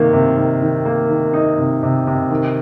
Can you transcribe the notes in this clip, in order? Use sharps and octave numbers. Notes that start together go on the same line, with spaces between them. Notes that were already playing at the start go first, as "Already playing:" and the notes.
Already playing: C3 D#3 A#3
C3
D#3
D#3
A#3
D#3
D#4
C3
C3
C3
D#3